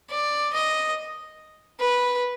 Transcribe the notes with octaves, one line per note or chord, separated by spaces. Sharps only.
D5
D#5
B4